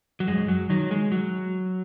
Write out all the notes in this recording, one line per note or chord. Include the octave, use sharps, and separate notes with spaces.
F#3
F#2 G#3
F#3
D#3 F#3
G#3
F#3